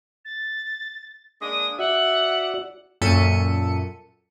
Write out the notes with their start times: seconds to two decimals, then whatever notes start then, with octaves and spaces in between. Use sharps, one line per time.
0.25 A6
1.41 G#3 A#3 D4 D#6
1.79 F#4 D5 E5 F#5
3.01 F#2 A#2 A4 E5 C#7 D#7